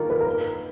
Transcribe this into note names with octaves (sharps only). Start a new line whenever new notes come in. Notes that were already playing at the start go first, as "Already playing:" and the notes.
Already playing: D#3 A#3 D4 F4 A#4
B4
A#4
B4